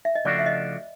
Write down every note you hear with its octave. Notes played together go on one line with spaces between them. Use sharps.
E5
D#5
C#3 F3 A3 D4 F#4 D5
E5
D#5